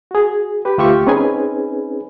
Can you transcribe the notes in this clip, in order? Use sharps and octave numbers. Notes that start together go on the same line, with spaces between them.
F#4 G#4
G4 B4
D2 F4 G4 E5 C#6
C4 C#4 D#4 G#4 B4 G#5